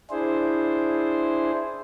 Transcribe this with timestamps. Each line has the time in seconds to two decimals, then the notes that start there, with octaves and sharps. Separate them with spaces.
0.10 D4 E4 G#4 C5